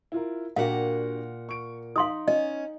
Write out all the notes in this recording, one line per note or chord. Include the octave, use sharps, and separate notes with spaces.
E4 F4 A#4
A#2 D4 F#4 G4 A#4 F5 F#5
C#6 D7
D#4 F5 C6 D#6 F#7
C#4 D#5